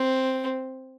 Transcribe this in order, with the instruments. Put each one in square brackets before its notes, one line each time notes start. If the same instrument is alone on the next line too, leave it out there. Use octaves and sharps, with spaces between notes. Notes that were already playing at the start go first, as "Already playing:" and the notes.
Already playing: [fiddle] C4